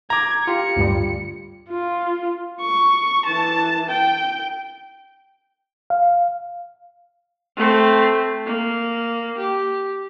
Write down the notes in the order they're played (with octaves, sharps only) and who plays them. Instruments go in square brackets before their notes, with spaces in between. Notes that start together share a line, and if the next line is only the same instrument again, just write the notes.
[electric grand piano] A#5 D6 [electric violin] G#6
[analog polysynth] F4 G4 [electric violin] C#7
[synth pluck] D2 G2 G3
[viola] F4
C#6
E3 A5
G5
[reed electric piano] F5
[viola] A3 C4
A#3
G4